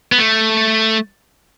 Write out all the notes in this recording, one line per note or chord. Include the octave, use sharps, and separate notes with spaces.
B3
A3